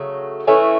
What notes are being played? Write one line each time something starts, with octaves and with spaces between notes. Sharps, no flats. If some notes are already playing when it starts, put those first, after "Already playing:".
Already playing: C#3 F#3 A3
E3 A3 C#4 E4